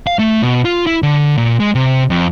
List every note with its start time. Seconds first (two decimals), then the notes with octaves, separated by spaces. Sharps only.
0.07 F5
0.19 A3
0.42 B2
0.65 F4
0.87 E4
1.03 D3
1.38 A#2
1.60 G#3
1.75 C3
2.10 F2